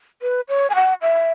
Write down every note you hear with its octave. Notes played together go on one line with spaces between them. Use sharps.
B4
C#5
G#5
F#5
E5